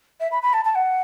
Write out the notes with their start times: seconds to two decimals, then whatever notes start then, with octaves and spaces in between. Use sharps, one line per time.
0.20 E5
0.31 B5
0.42 B5
0.53 A5
0.65 A5
0.75 F#5